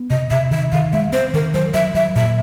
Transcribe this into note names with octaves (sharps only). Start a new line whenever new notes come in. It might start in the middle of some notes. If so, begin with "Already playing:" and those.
Already playing: B3
C3 D#5
C3 E5
D#3 E5
D#3 F5
G#3 E5
C4 C5
D#3 A#4
F#3 C5
F#3 E5
F#3 E5
A#2 E5